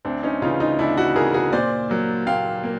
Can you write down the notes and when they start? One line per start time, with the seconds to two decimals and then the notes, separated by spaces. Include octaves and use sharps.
0.05 D2 C4 D4
0.23 C#4 D#4
0.42 C#3 E3 D#4 F4
0.60 D#4 F4
0.79 D2 D4 E4
0.97 E4 F#4
1.16 C#3 E3 G#4 A#4
1.34 F#4 G#4
1.53 A#2 C5 D5
1.90 F#3 A#3
2.27 A#2 F5 G5
2.64 A#3